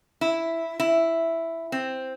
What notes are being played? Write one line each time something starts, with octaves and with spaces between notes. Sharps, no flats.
E4
E4
C4